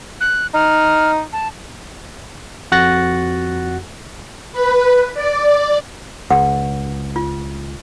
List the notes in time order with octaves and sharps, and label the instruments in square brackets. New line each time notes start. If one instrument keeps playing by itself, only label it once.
[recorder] F#6
[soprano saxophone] D#4 [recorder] F6
[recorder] A5
[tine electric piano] F2 F#4 F#5 F#6 A6 A#6
[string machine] B4
D5
[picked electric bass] C#2 [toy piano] F#5
[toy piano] F4